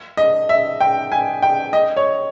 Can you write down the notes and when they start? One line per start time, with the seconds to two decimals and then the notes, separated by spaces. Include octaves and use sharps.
0.17 D#5
0.49 E5
0.81 G5
1.12 G#5
1.42 G5
1.73 D#5
1.97 C#5